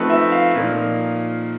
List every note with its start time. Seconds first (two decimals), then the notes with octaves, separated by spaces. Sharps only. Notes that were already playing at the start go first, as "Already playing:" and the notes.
Already playing: F3 A3 C4 D#4 A4 B4
0.10 E5
0.32 F5
0.55 A#2 F3 A#3 D#4